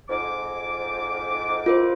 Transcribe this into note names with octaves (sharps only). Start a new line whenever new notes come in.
F2 G#2 D6
F4 A#4 C5